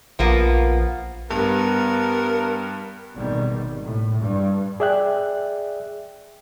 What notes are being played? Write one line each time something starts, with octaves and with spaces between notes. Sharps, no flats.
A#1 F3 A#3 B3
G2 B3 A#4
G#1 B2 D#3 G3
A2
G2
G#4 D5 E5 G5 F#6